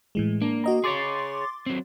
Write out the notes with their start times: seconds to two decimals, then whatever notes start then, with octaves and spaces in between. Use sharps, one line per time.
0.15 A2 E3 G#3
0.42 A#3 D4
0.64 F#4 D#5 A#5
0.84 G#4 C#5 C6 D6 A6
1.66 F#3 C4